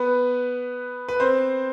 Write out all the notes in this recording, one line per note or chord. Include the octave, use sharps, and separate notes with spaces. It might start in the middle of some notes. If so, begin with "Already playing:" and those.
Already playing: B3 B4
B4
C4 C5